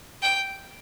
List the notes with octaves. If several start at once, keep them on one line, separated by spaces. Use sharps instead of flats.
G5